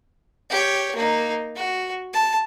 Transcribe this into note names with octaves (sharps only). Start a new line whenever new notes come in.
G4 C#5
A#3 D#4
F#4
A5